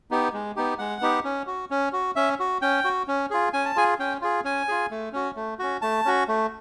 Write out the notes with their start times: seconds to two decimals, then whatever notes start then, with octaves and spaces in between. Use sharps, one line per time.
0.11 B3 D#4 G4
0.33 G#3
0.56 B3 D#4 G4
0.78 G#3 F#5
1.01 B3 D#4 G4
1.24 C#4
1.47 F#4
1.71 C#4
1.93 F#4
2.16 C#4 E5
2.40 F#4
2.62 C#4 G5
2.84 F#4
3.08 C#4
3.30 F4 G#4
3.53 C#4 G#5
3.65 A5
3.76 F4 G#4 G#5
3.99 C#4 G5
4.22 F4 G#4
4.44 C#4 G#5
4.68 F4 G#4
4.91 A3
5.13 C#4 F#4
5.36 A3
5.59 C#4 F#4
5.82 A3 A5
6.05 C#4 F#4
6.28 A3